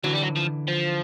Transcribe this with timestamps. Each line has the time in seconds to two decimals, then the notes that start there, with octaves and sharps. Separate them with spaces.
0.04 D3 E3 F#3
0.13 G3
0.22 F#3
0.36 F3
0.68 F3